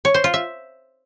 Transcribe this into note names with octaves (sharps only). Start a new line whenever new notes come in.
C#5
C5
F4
E5